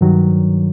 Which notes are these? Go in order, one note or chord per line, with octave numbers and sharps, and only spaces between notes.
G2 D#3 F#3